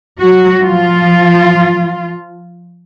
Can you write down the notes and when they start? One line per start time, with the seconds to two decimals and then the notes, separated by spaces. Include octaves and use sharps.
0.20 F#3 F#4
0.61 F3 F4